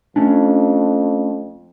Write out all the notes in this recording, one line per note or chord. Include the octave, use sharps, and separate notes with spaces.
F2 A3 C#4 D4